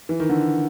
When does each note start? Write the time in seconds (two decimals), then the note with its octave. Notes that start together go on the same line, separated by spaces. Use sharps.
0.09 E3
0.20 D#3
0.29 D3